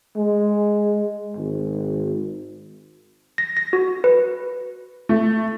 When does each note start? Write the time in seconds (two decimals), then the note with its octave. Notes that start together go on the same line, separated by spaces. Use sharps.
0.17 G#3
1.37 G#1
3.38 A#6
3.57 A#6
3.73 F#4
4.04 B4
5.09 A3